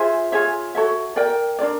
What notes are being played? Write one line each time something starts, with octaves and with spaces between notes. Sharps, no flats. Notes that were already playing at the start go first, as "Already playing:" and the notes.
Already playing: F4 G#4 C5 E5
F4 G#4 C#5 E5
F#4 A4 C#5 E5
A#4 D5 G5
D4 F4 A#4 D5